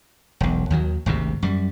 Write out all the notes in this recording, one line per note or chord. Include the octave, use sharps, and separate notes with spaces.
E1 B1
D#2 D#3 F#3
G#1 D2 G#2 C3
F#2 G3